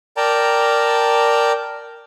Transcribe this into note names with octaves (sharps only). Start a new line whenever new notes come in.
A#4 D5 G5 A5 A#5